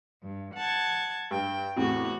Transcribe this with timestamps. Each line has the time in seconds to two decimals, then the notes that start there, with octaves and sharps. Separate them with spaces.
0.23 G2
0.55 F#5 A5 G#6
1.31 G2 G5
1.77 E2 A2 C3 F#4